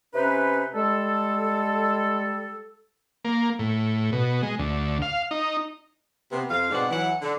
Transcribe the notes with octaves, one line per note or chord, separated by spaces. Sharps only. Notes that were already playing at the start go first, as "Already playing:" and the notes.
C3 C#4 D#4 B4
G3 G#3 A4
A#3
A2
B2
G#3
D2
F5
D#4
C3 B3
F2 F5
G#2 B2 C4 D4 D5 F#5
E3 F#3 F#5
D3